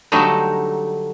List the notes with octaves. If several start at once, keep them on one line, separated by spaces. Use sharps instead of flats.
D3 F#3 G3 A3 D4 D#4